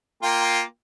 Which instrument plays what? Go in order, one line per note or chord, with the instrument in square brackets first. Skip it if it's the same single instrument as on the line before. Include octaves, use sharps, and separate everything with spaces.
[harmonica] A#3 F4 G5